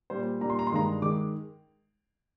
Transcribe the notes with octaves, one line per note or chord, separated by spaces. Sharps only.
A#2 G3 C5
A#2 G3 A#5
C6
A#5
C6
G2 D#3 G#3 A#5
D#3 G#3 D6